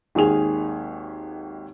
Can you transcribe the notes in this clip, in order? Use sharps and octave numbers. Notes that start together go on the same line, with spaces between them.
G#1 D#2 G#4 F7